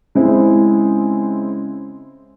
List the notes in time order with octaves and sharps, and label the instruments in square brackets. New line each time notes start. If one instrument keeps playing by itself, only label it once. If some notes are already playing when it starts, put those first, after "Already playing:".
[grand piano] C#3 G#3 C4 E4 C5